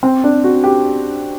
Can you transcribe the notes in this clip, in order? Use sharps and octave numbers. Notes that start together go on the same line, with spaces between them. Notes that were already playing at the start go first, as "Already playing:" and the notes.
C4
D4
F#4
G4